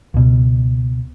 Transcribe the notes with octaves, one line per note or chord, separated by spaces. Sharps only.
C#2 B2